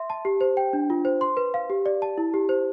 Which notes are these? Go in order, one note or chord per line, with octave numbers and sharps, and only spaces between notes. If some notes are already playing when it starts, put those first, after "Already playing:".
Already playing: E5 C6
A5
G4
C5
G5
D4
F4
C5
C6
B4
F5
G4
D5
A5
E4
G4
C5